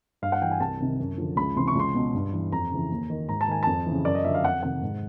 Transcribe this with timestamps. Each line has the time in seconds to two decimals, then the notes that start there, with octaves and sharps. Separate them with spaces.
0.22 G2 F5
0.32 F#5
0.42 E3 G5
0.51 G#5
0.60 C2 A5
0.80 C3 D#3
1.00 F#2
1.18 D3 F3
1.37 C#2 B5
1.56 C3 E3 C6
1.68 C#6
1.75 C#2 C6
1.95 B2
2.14 G2
2.33 E3
2.52 F2 A#5
2.71 C#3 E3
2.91 D#2
3.10 D#3
3.29 G#2 A#5
3.41 A5
3.48 D#3 G#5
3.63 F2 A5
3.86 C#3 E3
4.05 F#2 D5
4.15 D#5
4.24 D3 F3 E5
4.34 F5
4.44 F2 F#5
4.62 C3 D#3 F#5
4.83 G#2